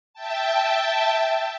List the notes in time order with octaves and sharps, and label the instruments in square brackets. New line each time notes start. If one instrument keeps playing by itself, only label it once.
[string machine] E5 G5 A5